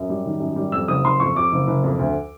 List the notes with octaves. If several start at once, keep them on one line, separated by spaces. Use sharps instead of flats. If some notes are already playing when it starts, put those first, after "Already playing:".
Already playing: F#2
G3
D#3
F#2
G3
F2 E6
F#1 D#6
F#1 C6
F2 C#6
F2 D6
F#1
F#1
F2
D2